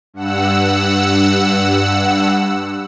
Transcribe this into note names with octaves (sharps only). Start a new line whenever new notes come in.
G2 F#5 E6